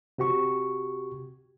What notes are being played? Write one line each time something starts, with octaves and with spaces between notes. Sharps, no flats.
C3 F#4 G4 C#6